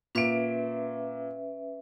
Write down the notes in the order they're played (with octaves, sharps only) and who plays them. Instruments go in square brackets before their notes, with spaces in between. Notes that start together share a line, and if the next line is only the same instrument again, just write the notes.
[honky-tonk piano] A#2 D7 [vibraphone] C#4 B4 E5